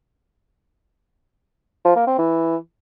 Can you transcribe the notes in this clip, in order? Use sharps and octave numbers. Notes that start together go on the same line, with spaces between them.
F3
A#3
C4
E3